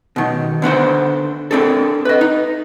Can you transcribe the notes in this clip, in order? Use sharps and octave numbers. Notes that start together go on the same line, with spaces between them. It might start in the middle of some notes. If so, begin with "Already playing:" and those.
B2 D#3
D3 B3 D4 C5
C4 D4 G#4 A4
B4 D#5
D#4